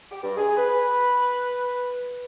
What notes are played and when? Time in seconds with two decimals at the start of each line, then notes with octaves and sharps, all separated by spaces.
0.12 G4
0.23 G2
0.38 G#4
0.57 B4